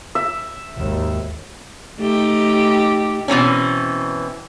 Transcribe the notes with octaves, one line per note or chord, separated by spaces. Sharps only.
E5
G#1 D#2
A3 D#4 G4
B2 E3 C4 C#4